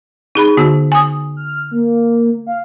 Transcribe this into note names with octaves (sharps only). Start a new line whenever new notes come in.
D#4 G#4 B5
D3 B3 F#4
G#5 D#6
F6
A#3
F5